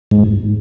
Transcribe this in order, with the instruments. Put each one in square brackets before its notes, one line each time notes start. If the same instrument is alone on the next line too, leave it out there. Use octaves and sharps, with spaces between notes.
[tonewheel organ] G#2